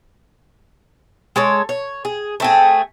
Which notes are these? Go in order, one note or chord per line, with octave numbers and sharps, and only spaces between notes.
G#3 A4 C#5
C#5
G#4
A3 C4 G#4